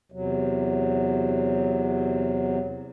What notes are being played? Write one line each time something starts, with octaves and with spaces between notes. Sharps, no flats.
E2 C3 F#3